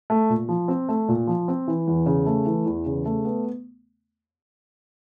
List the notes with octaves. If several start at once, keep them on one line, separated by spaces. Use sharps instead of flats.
A3
A#2
F3
C4
A3
A#2
F3
C4
E3
E2
C#3
A3
E3
E2
C#3
A3
B3